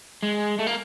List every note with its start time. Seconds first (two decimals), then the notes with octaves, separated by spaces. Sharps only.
0.23 G#3
0.59 A3
0.67 A#3